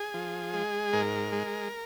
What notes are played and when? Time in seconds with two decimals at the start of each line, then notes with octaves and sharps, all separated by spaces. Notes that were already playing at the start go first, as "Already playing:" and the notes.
Already playing: G#4
0.14 F3
0.54 G#3
0.93 G#2 A#4
1.32 G#3